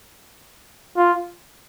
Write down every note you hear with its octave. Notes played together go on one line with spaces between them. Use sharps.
F4